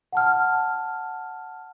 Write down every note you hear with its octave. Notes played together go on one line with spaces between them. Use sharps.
F#5 A5 F6